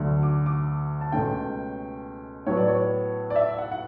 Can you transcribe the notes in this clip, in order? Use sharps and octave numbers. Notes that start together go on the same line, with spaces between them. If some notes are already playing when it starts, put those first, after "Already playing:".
Already playing: D2 D3 F#3
D6
D6
A5
C#2 B2 A3 C#4 G5
A2 F#3 B3 C#5
D5
C#5
D5
E5
F#5
F#5